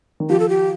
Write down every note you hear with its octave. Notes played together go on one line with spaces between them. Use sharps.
D#3
F3 G4
A4
G4